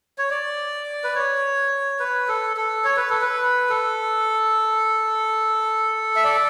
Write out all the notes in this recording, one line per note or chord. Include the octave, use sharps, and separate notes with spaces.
C#5
D5
B4
C#5
B4
A4
A4
C#5
B4
A4
B4
A4
E5
D5